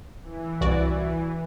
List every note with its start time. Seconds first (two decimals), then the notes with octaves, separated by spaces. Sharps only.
0.22 E3
0.61 C2 F#4 D5